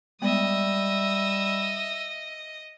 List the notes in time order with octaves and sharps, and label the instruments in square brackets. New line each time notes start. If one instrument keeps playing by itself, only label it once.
[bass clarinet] G3 [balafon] G#3 B3 [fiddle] D#5 [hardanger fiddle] E5 D#6